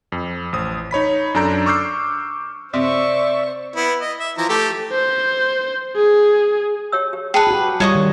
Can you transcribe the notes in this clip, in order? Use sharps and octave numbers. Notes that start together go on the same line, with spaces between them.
F2
A1 C5 D#6
D#4 C#5 B5 B6
F#2 D4 A4 A#5 G6 D7
C#6 D6 E6 F6 G6 C7
C3 C5 D5 E5 C#6
B3 E4
D#5
E5
E3 F3 A#5
A3 G4
C5
G#4
G4 C#5 E6
G4
G#4 B4 G5 A5
F#4 G4
G3 F4 C#5 D#5 A#5 C#6 D#6
D#3 G3